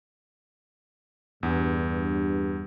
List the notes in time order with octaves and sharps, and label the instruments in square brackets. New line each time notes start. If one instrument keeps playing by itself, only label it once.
[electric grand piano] E2 [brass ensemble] G2